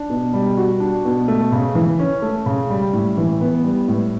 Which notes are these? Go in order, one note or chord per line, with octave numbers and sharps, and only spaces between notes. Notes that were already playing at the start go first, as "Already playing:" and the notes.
Already playing: D4
B2
G3
F#4
D4
B2
A3
C#3
E3
C#4
A3
C#3
G3
A2
E3
B3
G3
A2